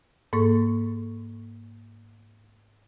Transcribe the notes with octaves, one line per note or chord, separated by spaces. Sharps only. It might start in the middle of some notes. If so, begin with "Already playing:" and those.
G#2 A#3 A4 C#6